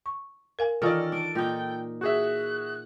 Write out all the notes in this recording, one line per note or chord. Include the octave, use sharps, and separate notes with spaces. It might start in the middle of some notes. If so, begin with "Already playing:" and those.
C#6
A#4 F5 G#5
D#3 E3 C#4 F4 A4 A#4 D5 F5
D4 D7
A#2 D#4 G5
F#4 G#4 E5 F#6